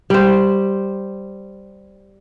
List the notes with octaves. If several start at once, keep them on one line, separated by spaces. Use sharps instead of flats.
G3 C5